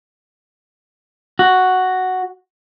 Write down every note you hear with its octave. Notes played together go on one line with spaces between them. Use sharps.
F#4